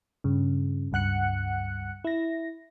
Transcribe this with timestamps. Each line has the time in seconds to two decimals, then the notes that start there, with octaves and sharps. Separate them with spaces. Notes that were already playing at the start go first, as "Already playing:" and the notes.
0.24 G2 C#3
0.92 C#2 G2 F#5 F#6 C#7
2.04 E4 A#6